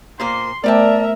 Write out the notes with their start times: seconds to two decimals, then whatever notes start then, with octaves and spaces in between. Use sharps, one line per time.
0.20 A#2 A#3 C5 C6
0.64 A3 B3 A#4 C5 D5 E5 G5 A5